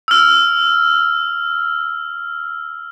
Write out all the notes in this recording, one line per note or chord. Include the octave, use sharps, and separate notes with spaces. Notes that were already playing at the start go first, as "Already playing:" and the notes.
E6 F6